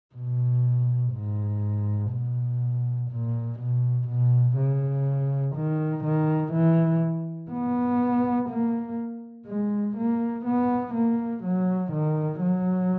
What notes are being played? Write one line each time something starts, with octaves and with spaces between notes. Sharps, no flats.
B2
G#2
B2
A#2
B2
B2
C#3
D#3
D#3
E3
B3
A#3
G#3
A#3
B3
A#3
F#3
D#3
F#3